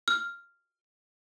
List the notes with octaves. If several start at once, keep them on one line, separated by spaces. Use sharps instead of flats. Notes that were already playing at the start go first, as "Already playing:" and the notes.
F6